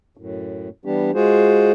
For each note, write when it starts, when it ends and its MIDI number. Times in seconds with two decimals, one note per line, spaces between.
0.17 0.69 42
0.17 0.69 45
0.85 1.11 52
0.85 1.11 55
0.85 1.11 59
0.85 1.11 62
0.85 1.11 67
1.15 1.72 56
1.15 1.72 65
1.15 1.72 66
1.15 1.72 68
1.15 1.72 72